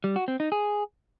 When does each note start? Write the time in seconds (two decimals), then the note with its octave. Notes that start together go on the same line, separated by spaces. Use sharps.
0.04 G3
0.16 F#4
0.28 C4
0.40 D#4
0.52 G#4